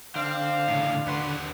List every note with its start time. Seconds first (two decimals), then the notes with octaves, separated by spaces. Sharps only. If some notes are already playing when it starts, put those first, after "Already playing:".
0.15 D3 C4 F5
0.68 A2 C#3
1.06 D#2 F#4 B4 C6